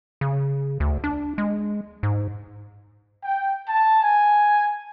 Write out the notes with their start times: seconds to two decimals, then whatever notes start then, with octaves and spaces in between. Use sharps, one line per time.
0.21 C#3
0.80 D2
1.04 D4
1.38 G#3
2.03 G#2
3.23 G5
3.69 A5
4.03 G#5